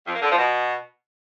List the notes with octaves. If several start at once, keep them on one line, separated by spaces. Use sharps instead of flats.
F2
A#3
D3
F3
B2